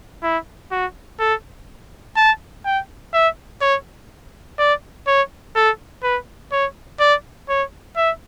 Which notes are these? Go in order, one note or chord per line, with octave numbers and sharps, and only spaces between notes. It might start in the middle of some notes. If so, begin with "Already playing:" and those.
E4
F#4
A4
A5
G5
E5
C#5
D5
C#5
A4
B4
C#5
D5
C#5
E5